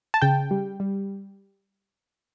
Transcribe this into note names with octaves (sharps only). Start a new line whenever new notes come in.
A5
C#3 G5
G3
G3